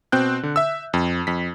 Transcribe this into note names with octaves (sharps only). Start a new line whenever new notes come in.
B2 C4 G5 F#6 G6
D3
E5 E6
F2
F2 B6